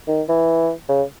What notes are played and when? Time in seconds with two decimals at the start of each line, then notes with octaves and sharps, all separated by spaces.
0.08 D#3
0.29 E3
0.89 C#3